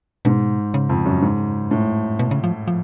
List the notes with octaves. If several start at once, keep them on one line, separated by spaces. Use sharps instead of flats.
G#2 B2
C#3
F2
F#2
G#2
A2
B2
C#3
F3
F3